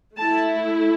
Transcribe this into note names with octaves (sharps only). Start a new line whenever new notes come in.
A3 E4 A5